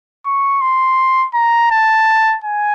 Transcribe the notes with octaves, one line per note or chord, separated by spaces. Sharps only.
C#6
C6
A#5
A5
G#5